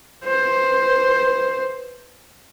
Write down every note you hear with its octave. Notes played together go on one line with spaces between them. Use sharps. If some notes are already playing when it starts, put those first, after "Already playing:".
B4 C5